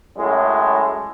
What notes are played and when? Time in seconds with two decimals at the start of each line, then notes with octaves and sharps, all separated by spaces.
0.17 F#2 A2 G#3